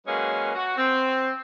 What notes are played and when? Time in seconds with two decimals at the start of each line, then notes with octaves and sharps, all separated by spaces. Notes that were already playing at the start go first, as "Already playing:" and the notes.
0.06 F#3 G#3 A#3 C#4 B4 D#5
0.54 F#4
0.77 C4